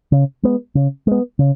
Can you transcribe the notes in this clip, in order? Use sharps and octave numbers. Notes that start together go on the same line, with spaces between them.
C#3
G#3 B3
C#3
G#3 B3
C#3